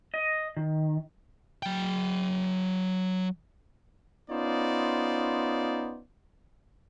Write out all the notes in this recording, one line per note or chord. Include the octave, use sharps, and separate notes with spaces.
D#5
D#3
F#3 G5
B3 C#4 D#4 F4 C5 D5